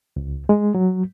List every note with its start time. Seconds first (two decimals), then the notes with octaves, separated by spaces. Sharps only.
0.16 C#2
0.49 G#3
0.75 F#3